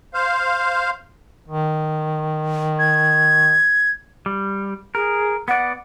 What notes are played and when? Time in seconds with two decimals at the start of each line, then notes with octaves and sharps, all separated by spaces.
0.14 C5 F5
1.48 D#3
2.79 G#6
4.26 G3
4.95 G#4 A#4
5.48 B3 D5 F#5